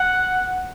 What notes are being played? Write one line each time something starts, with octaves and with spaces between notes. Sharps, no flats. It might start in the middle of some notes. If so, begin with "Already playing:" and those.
Already playing: F#5